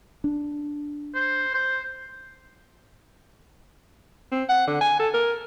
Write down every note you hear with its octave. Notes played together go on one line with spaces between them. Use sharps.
D4
C5
C5
C4
F#5
D3
G#5
A4
A#4